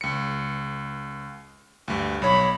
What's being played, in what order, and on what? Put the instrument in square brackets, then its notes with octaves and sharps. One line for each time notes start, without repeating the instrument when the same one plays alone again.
[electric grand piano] C#2 C#7
D2 G2
[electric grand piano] B1 C#5 [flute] B5